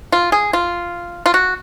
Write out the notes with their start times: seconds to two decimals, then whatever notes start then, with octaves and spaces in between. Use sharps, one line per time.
0.12 F4
0.32 G#4
0.53 F4
1.26 F4
1.34 F#4